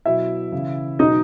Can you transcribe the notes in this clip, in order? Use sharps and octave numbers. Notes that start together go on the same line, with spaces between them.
B2 F#3 E4 E5
C#3 E3
B2 F#3 D#4 D#5